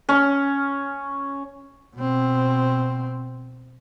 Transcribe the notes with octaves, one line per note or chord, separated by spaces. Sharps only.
C#4
B2 C4